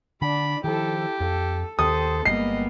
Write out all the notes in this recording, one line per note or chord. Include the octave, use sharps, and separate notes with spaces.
D3 D4 D5 B5
D#3 F3 E4 G4 A4
F2 A4
D#2 D#3 G4 A4 C5 D#6
G1 G3 G#3 A#3 B3 D#5 C7